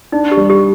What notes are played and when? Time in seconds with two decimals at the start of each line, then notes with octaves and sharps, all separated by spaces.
0.12 D4 D#4
0.32 G4
0.37 G3
0.50 G4